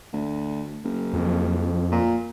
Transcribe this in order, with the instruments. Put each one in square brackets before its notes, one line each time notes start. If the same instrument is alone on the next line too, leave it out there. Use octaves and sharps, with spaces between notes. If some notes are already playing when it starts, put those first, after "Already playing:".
[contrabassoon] D2
F#1
[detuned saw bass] F2
[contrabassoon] A#2